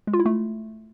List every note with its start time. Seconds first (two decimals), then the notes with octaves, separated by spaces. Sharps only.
0.07 G#3
0.13 F4
0.20 E4
0.26 A3